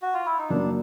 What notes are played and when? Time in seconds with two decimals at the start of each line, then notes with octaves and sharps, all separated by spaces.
0.02 F#4
0.14 F4
0.26 E4
0.39 D#4
0.49 F#2 C#3 F#3 A#3 D4